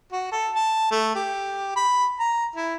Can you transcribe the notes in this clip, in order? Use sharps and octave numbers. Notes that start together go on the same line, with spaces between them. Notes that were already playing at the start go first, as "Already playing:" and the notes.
F#4
A4
A5
A3
G4
B5
A#5
E4